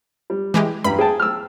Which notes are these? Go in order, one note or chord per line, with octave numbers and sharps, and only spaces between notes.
G3
E3 G#3 G4
G2 A#5 B5
G#4 G5 A5
E6 F6